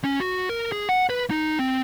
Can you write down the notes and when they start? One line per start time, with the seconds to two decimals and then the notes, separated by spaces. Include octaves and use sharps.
0.04 C#4
0.20 F#4
0.49 A#4
0.72 G#4
0.89 F#5
1.09 B4
1.30 D#4
1.59 C4